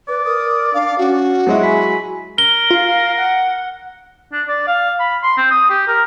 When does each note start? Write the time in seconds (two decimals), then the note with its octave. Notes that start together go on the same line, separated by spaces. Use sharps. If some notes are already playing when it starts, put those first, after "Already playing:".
0.08 B4 D5
0.25 A#4 D#6
0.74 D4 F5
0.98 C#4 F#4
1.47 F#3 G#3 E4
1.63 G#5 B5
2.38 A#4 G7
2.71 F4 F5
3.17 F#5
4.33 D4
4.48 D5
4.68 F5
5.00 B5
5.23 C6
5.37 C4
5.51 D#6
5.70 G4
5.88 A#4